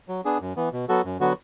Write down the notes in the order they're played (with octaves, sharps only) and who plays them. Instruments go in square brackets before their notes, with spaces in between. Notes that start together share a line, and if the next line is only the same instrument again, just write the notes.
[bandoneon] F#3
B3 D4 G#4
F#2
E3 B3
B2
F#3 B3 F#4 A4
F#2
D3 F#3 B3 F#4